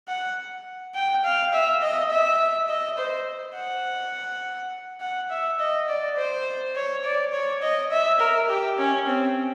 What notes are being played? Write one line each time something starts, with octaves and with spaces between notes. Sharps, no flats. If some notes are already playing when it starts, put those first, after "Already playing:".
F#5
G5
F5
E5
D#5
E5
D#5
C5
F#5
F#5
E5
D#5
D5
C5
C#5
D5
C#5
D#5
E5
A#4
G4
C#4
C4